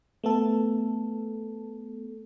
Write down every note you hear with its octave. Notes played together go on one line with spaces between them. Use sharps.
A3 B3 A4